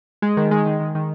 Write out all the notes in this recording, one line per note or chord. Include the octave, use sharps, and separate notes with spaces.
G#3
D#3
G#3
D#3
D#3
D#3